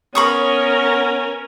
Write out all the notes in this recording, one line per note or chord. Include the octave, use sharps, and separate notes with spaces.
B3 C#4 A#4 C#5 B5 C#6 D#6